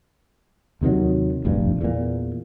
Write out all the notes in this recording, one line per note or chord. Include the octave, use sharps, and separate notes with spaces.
D#2 C3 D#3 F#3
F1 A#1 E2 G2
E2 A#2